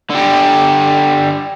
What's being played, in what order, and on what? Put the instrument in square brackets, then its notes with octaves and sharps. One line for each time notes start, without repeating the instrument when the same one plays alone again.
[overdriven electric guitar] D3 G3